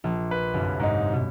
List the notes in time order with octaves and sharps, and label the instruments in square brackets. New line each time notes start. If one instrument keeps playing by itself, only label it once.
[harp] A#1
[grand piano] B4
[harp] G1 C2 F#2
[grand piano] G#2 D#4
[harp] B2 B3